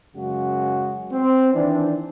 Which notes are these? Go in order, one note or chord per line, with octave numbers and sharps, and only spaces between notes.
F#2 C#3 G#3 F#4
C4
D#3 E3 D4